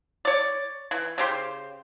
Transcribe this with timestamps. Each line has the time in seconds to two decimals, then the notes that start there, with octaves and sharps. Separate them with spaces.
0.25 C#5 D5
0.91 E3
1.18 C#3 G4 C5